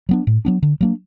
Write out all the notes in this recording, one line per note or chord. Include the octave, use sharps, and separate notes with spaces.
F#3 B3 D4
A2
F#3 B3 D4
D3
F#3 A#3 D4